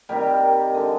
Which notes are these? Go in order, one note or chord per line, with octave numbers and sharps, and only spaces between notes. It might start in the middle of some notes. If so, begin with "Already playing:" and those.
C3 D#3 G3 A#3 G4
D3 G#3